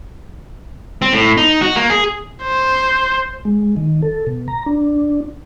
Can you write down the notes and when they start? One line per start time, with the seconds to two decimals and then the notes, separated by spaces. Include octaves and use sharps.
1.02 C4
1.13 A2
1.37 D#4
1.62 F#4
1.76 A#3
1.90 G#4
2.43 C5
3.45 G#3
3.77 D#3
4.02 A4
4.27 B2
4.48 A#5
4.66 D4